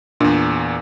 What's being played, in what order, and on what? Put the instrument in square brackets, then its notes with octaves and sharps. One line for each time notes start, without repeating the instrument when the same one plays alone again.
[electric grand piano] E2 A#2 [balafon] D4